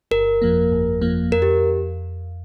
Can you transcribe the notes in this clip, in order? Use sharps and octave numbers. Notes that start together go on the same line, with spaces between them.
G1 A#4
F2 F3 A#3
G1
F2 F3 A#3
F2 A#4
G4